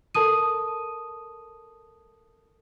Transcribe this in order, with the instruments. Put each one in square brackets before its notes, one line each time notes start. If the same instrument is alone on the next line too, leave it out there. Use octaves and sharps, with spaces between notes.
[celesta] A4 A#4 A5 D#6 D#7